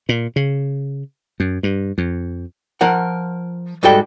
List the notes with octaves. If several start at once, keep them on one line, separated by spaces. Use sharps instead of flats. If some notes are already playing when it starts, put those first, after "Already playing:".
A#2
C#3
F#2
G2
F2
F3 A#4 F#5
G#2 G3 F#4 A4 G5